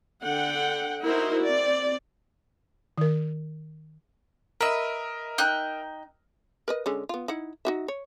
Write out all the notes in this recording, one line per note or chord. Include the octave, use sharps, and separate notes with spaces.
D3 F#5 G5
D#4 E4 F#4 A#4 C5
C4 D5
D#3 A#4
A#4 B4 D#5 E5 E6
D#4 G5 F#6
A#4 B4 D#5
D3 G#3 C#4
B3 F4
D#4 E4 F#5
D#4 F#4 E5
C#5